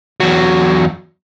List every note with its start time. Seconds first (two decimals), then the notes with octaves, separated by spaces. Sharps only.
0.20 E2 F#3